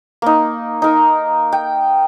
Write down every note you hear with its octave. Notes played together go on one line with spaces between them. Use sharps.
A#3 D#4
D#4 A#4
G5